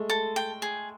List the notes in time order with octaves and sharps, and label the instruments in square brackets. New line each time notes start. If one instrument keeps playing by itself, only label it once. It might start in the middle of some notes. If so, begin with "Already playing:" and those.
Already playing: [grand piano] G#3 A3
[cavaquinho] A4
G5
G#4